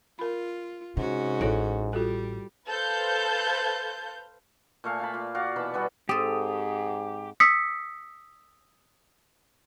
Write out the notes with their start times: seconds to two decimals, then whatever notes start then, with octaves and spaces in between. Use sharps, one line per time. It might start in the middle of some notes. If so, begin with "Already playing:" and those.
0.19 F4 A#4 B5
0.97 G#2 C3 C#4 F#4
1.41 A1 E4 A4 C#5
1.93 G3 F4 F#4 A4
2.69 A4 B4 C5 F5 G6
4.84 A#2 A3 F5 G#5
4.99 F5 A5 B5
5.14 A#2
5.35 F#4 D5 F5
5.56 B2 E3 A5 B5
5.74 G3 B3 F#4 G#4
6.09 G#2 C4 G4 A4 D#6
7.40 D#6 E6 B6 C#7